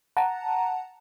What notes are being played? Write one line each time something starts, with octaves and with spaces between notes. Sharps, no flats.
F#5 A5 A#5